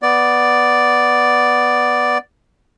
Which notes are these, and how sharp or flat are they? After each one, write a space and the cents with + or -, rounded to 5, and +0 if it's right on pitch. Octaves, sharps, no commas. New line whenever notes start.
B3 +0 D5 +0